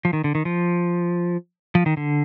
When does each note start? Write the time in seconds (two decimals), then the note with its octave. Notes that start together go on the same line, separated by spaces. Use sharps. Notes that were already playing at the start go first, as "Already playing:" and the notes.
0.05 F3
0.13 D#3
0.24 D3
0.35 D#3
0.45 F3
1.75 F3
1.86 D#3
1.97 D3